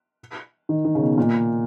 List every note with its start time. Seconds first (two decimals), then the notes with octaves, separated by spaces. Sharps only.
0.69 D#3
0.85 D#3
0.95 C#3
1.01 B2
1.18 A#2